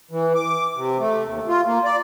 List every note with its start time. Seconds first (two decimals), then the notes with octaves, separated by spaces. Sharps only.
0.11 E3
0.35 D6
0.76 C3
0.98 A3
1.24 D#2
1.48 F4
1.66 A#3
1.84 D5